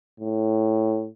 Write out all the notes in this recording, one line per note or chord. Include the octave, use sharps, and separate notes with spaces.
A2